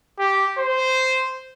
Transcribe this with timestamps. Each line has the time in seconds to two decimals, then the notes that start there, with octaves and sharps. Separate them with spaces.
0.19 G4
0.58 C5